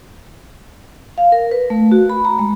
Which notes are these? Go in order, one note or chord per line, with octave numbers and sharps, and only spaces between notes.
F5
A#4
B4
A3
F#4
B5
A#5
G#3